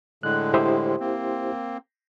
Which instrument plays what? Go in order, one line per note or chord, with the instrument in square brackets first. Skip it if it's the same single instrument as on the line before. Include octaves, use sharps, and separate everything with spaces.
[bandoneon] A2 D3 G#3 [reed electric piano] F#6
[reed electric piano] E4 G4 C5
[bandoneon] A#3 C4